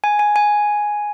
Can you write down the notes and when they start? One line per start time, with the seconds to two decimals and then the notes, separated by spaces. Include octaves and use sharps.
0.04 G#5
0.19 G#5
0.36 G#5